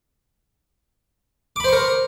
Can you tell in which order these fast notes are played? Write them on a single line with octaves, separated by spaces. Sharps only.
D6 B5 C5 C#6 A#4